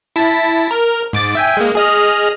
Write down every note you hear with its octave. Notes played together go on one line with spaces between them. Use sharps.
E4 A5 B6
A#4
G#2 D6 A6
E5 G5 G#5
G#3 A#3
G#4 D#5 F6